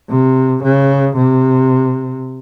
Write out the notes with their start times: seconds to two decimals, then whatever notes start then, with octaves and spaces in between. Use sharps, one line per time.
0.10 C3
0.63 C#3
1.16 C3